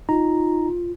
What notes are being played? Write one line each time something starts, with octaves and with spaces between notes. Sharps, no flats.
D#4 F4 A#5